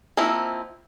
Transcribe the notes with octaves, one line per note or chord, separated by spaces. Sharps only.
F3 A#3 C4 D#4 E4